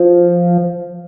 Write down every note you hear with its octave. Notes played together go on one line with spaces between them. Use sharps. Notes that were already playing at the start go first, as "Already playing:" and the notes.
Already playing: F3